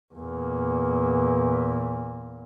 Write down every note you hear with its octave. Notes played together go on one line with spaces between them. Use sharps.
E2 A#2